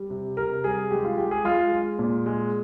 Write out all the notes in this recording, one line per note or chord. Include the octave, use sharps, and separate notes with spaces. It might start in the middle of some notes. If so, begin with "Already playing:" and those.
Already playing: G3
C3
C3 A#4
G3 G#4
G#3 G4
F4
G#3 G4
G#4
G#3 F4
G#3
A#2
G#3